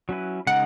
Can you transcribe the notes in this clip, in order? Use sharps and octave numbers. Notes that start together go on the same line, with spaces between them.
F#3 C#4 E4 B4
C#3 G#3 D#4 A#4 F#5